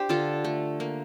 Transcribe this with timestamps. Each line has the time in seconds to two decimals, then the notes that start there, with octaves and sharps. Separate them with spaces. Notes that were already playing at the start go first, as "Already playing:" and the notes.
Already playing: D4 G4 C5
0.09 D3 F4 A4
0.45 A3
0.80 A#3